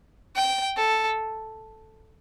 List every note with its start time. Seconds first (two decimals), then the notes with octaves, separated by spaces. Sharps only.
0.36 G5
0.77 A4